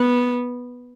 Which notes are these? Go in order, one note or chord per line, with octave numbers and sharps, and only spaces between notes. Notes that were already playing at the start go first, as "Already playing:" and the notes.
Already playing: B3